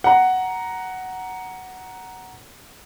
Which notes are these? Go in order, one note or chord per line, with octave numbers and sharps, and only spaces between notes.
F#5 A#5